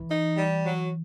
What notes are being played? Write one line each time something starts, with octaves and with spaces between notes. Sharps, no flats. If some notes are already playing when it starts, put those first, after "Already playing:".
Already playing: E3
D#4
G3
F#3